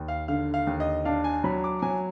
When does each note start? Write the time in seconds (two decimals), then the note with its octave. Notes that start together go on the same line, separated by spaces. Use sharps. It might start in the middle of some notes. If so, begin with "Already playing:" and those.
Already playing: D#2
0.08 F5
0.28 D3 F5
0.54 F5
0.67 D#2
0.80 D#5
1.05 D4 F5
1.24 G#5
1.44 F#3 B5
1.64 D6
1.82 F#3 G#5